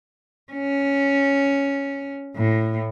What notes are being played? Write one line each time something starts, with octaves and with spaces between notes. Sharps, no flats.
C#4
A2